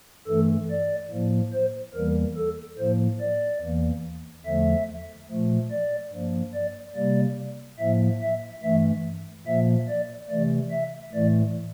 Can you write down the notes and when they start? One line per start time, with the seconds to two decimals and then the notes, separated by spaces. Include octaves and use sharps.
0.28 G2 E3 A3 A4
0.70 D5
1.11 A2 F3 A#3
1.53 C5
1.94 E2 E3 G3 A#3 A#4
2.37 A4
2.78 A2 F3 A#3 C5
3.20 D5
3.61 E2 E3 A#3
4.45 E2 D3 F3 A3 E5
5.29 A#2 F3 A3
5.71 D5
6.13 G2 F3 A#3
6.54 D5
6.95 C3 G3 A#3 D5
7.79 A2 F3 A#3 E5
8.22 E5
8.63 G2 E3 A3 E5
9.47 A#2 F3 A#3 E5
9.89 D5
10.30 C3 E3 A3 D5
10.71 E5
11.13 A2 E3 A3 D5